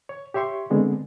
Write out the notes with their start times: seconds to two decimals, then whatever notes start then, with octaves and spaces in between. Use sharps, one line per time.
0.09 C#5
0.34 G4 C#5 E5 C6 C#6
0.70 D3 G#3 B3 C4